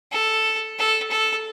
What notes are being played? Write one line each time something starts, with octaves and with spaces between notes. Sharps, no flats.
A4
A4
A4